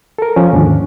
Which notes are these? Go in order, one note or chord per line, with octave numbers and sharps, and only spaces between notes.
A4 A#4
F3 C#4
D#2 G#2 D3 D4